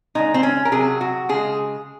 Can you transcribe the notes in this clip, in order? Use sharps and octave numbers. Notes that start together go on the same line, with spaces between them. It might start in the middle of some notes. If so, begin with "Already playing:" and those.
C#3 F3 G#3 D#4
C4
C#4
A#4
C3 F#3 G#4
F#4
C#3 G#3 G#4